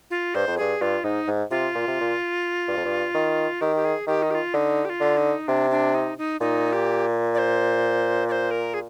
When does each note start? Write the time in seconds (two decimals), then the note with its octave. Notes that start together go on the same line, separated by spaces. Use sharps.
0.10 F4
0.35 G2 C5
0.48 F2
0.57 G2 G#4
0.81 G2 F4
1.04 G#2 D#4
1.28 G#2
1.51 C3 F4
1.75 A#2
1.88 C3
2.01 A#2
2.68 G2
2.77 F2
2.85 G2
3.15 D#3
3.61 D#3 G4
3.76 G4
3.85 G#4
4.07 D#3 G4
4.23 D#4
4.31 G4
4.35 F4
4.54 D3 D#4
4.85 G4
4.89 F4
5.01 D3
5.17 D#4
5.48 C3 D4
5.71 D4
5.95 D#4
6.18 D#4
6.41 A#2 D#4
6.73 G4
7.34 D5
7.38 C5
8.28 D5
8.32 C5
8.51 A#4
8.74 G#4